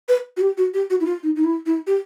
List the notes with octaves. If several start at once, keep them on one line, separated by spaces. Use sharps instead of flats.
B4
F#4
G4
F#4
G4
F#4
E4
F4
D#4
D#4
E4
E4
G4